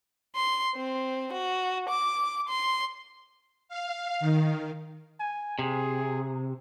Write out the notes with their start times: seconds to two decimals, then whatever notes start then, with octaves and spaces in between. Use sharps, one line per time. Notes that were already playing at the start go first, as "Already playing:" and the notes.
0.36 C6
0.76 C4
1.33 F#4
1.89 D6
2.49 C6
3.69 F5
4.20 D#3
5.20 G#5
5.59 C3 G#4